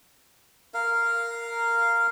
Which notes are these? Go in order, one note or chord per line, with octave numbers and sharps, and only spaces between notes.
A#4 F5